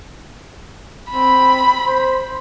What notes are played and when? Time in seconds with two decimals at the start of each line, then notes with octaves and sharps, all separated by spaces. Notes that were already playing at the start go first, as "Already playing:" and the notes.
1.10 C4 B5
1.86 C5